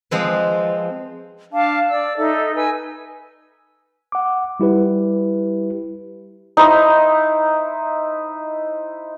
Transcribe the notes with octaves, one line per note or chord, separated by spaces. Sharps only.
F3 G#3 C4 B4
D4 F5 A5 D6
D5 E6
D#4 A4 E5
B4 G#5 E6
F#5 D6
G3 E4 G4 B4
D#4 E4 C5 D#5